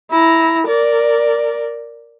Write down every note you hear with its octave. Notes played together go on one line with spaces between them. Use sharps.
E4 A#5
A#4 D5